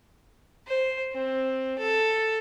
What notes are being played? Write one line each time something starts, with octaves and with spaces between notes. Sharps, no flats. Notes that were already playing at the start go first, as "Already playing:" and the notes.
C5
C4
A4